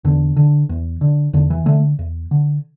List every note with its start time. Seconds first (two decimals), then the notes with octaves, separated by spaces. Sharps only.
0.05 E2 D3
0.36 D3
0.69 E2
1.01 D3
1.33 E2 D3
1.50 E3
1.66 D3 A3
1.99 E2
2.31 D3